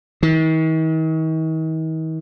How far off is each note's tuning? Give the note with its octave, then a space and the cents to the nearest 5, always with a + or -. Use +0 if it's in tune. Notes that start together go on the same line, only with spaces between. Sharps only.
D#3 +45